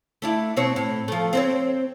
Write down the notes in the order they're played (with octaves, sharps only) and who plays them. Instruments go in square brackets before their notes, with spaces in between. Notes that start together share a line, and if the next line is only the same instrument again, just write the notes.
[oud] A3 D4 E4
B2 C4 C#5
A2
F3 A3
C4 C5 C#5